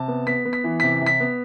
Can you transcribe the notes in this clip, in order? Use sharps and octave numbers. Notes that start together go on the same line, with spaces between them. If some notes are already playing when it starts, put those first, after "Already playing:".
Already playing: C3 A5
B3
B3 B6
B3
B6
E3
C3 B6
C3
B6
B3